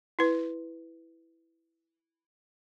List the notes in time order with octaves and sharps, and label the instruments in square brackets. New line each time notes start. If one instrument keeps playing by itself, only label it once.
[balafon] E4 B4